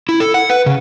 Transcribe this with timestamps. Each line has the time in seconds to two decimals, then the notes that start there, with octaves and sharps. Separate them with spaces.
0.09 E4
0.20 A4
0.34 F#5
0.50 B4
0.66 C#3